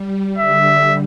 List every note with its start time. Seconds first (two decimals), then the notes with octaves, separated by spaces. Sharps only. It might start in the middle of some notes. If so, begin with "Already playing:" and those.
Already playing: G3
0.38 D3 E5